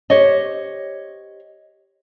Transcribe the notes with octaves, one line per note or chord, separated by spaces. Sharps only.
G4 C5 C#5 D#5